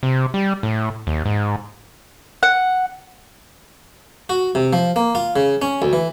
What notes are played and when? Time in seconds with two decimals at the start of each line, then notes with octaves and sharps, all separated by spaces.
0.03 C3
0.34 G3
0.63 A2
1.07 D#2
1.25 G#2
2.43 F#5
4.29 F#4
4.55 C3
4.73 F3
4.96 A#3
5.15 F4
5.36 C#3
5.62 C#4
5.82 D2
5.93 E3